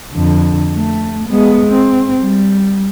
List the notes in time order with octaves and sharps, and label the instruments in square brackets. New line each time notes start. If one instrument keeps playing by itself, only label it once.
[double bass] F2 D3
A3
G#3 B3
C4
G3